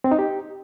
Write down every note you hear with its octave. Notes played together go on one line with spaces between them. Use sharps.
C4
D#4
G4